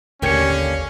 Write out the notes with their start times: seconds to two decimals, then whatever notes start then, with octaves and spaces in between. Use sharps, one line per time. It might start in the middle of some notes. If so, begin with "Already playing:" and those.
0.22 G#1 D#2 D3 A#3 C#4 G4 G#6 C#7